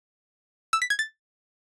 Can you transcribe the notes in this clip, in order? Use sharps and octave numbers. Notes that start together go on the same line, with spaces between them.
E6
B6
G#6
A6